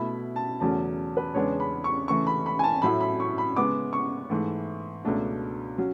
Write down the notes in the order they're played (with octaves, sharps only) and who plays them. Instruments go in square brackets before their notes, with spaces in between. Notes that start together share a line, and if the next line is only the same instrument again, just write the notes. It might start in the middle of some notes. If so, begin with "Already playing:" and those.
Already playing: [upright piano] B2 A3 E4 B5
A5
E2 C#3 F#3 A3 C#4 A5
B4
E2 C#3 G#3 B3 D4 C#5
B5
C#6
C#3 E3 A3 C#6
B5
B5
G#5
A5
A2 F#3 A3 E4 B5
B5
C#6
B5
C#3 G#3 B3 D6
C#6
G#2 E3 A3
C#2 B2 A3 D4
F#3 C#4